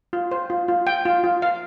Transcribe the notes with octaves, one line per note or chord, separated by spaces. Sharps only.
F4
C5
F4
F4
G5
F4
F4
F5